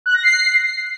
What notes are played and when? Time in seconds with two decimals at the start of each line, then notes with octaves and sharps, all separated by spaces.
0.06 F#6
0.14 A#6
0.23 C7